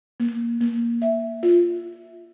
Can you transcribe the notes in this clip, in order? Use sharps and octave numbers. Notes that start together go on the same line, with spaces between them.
A#3
A#3
E5
F4